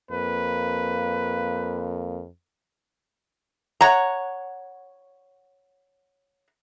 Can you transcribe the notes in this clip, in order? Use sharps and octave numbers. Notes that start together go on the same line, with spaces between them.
F2 A#3 B4
C#5 F#5 A#5